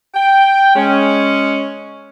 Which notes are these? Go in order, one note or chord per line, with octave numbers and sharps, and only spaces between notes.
G5
G#3 C#4